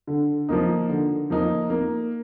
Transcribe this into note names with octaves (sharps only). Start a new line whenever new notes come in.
D3
F3 A#3 D#4
D3
F3 A#3 D#4
A#3